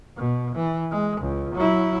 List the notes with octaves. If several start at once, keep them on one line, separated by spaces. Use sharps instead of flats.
B2
E3
G#3
C#2
F#3 E4